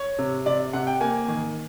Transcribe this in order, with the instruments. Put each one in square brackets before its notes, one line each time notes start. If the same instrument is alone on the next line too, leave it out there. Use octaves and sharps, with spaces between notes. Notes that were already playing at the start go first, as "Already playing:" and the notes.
Already playing: [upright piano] C#5
C3
C3 D5
C3 F#5
G5
A#3 G#5
D#3